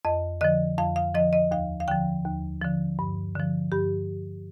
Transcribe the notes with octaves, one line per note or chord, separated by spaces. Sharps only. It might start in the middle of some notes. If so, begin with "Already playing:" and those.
F2 D#5
D3 F3 D#5
F2 F5
F5
D3 F3 D#5
D#5
D#2 F5
F5
D3 F3 G5
D#2
D3 F3
G2
D3 F3
G2 G4